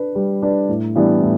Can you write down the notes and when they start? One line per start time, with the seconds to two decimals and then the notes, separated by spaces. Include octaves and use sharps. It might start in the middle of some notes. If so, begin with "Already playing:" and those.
Already playing: D4 B4
0.15 G3
0.42 D4 B4
0.69 A2
0.96 E3 G3 B3 D4
1.22 A2